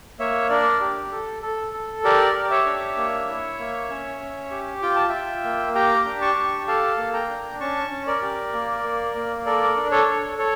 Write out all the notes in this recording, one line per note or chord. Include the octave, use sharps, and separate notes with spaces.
A#3 C#5 E5
D4 A#4 D5
G4
A4
A4
A4
G4 A#4 D5
G4
C#5 E5
D4
A#3
E4
A#3
C#4
C#4
G4
F4 G5
A5
F4 E5 G5
A#3
G4 G5 A#5
D4
A5 C#6
G4
A4 F5 A5
A#3
G5 A#5
D4
C#4 A5 C#6
C#4
A#4 D5
G4
A#3
A#3
A#3
A4 A#4 D5
D4
A4 C#5
A4
A4 C#5